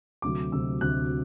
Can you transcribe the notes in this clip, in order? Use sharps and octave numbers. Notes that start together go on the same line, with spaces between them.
D2 C3 F#3 A3 D6
D2 C3 F#3 A3 E6
D2 C3 F#3 A3 F#6